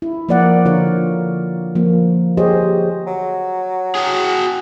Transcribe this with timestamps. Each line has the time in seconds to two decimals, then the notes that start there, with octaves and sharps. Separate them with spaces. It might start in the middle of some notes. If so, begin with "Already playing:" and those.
0.02 E4
0.29 F3 A#3 A#4 D5 F5 F#5
0.65 D3 F4 A#4 C#5
1.75 F3 A#3
2.37 G4 G#4 C5 C#5 D#5
3.07 F#3
3.95 F#4 G#4